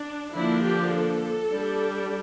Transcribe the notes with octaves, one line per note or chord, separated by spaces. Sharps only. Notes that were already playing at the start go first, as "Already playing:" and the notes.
Already playing: D4
D3 F3 A#3 D4 E4
G4
A4
G3 D4